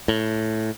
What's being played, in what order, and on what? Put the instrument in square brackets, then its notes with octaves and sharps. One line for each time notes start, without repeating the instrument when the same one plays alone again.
[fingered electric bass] A2